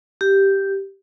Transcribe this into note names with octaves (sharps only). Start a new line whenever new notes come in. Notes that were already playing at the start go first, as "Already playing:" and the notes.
G4